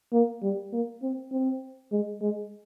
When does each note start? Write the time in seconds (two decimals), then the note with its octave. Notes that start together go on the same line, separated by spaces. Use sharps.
0.12 A#3
0.42 G3
0.72 A#3
1.02 C4
1.32 C4
1.92 G#3
2.21 G#3